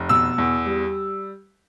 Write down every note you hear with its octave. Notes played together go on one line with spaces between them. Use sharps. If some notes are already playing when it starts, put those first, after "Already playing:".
Already playing: F1
B2 E6
E2
G3